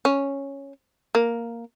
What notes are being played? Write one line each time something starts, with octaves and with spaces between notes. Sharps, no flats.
C#4
A#3